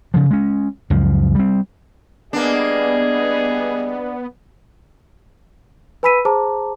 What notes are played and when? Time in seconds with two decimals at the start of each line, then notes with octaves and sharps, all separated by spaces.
0.14 C#3 F3
0.30 G#3 C#4
0.90 C#2 F#2 F3
1.35 G3 C4
2.33 G3 A#3 B3 D4 G#4 D#5
6.03 B4 G#5 B5 E6 B6 D#7
6.25 G#4 C5 A5 A#5 D6